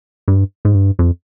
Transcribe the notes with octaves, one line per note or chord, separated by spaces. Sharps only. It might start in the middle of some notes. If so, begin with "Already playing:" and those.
G2
G#2
G2
F2